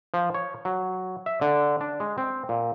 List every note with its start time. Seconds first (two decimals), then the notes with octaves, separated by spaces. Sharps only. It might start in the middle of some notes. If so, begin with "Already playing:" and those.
0.14 F3
0.34 C#5
0.65 F#3
1.26 E5
1.41 D3
1.81 D4
2.00 G#3
2.18 C4
2.49 A#2